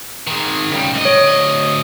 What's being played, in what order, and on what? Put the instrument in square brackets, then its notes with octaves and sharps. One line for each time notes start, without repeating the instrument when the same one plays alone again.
[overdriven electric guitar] D#3 G#3
C#3 G3
D2 D#5
[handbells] C#5